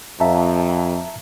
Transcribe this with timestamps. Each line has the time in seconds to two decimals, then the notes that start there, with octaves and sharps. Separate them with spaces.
0.20 F2 E5 A5 A#5